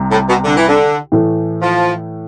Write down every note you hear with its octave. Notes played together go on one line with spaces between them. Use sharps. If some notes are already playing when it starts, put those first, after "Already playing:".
Already playing: C2 C3
A2
B2
D3
E3
D3
A2 E3 A3
F3